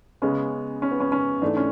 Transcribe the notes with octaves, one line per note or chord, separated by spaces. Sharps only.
C#3 G#3 B3 C#4
C#4
B3
C#4
C#4
G#2 E3 A3 D4
C#4